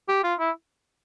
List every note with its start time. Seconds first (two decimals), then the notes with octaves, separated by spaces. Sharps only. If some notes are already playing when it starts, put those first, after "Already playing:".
0.09 G4
0.24 F4
0.40 E4